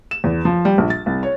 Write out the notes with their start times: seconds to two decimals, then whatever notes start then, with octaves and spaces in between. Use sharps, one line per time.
0.11 E7
0.24 E2
0.45 F3
0.65 G3
0.78 A#1
0.90 A6
1.06 C2
1.23 C#5